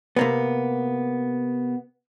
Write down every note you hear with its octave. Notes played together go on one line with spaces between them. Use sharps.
C3 A#3 B3